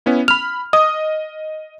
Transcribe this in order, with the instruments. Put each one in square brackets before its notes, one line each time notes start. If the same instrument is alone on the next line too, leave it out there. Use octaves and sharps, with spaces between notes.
[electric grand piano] B3 C#4 E4
[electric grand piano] B5 F6 [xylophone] F7
[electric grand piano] D#5 [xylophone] D#6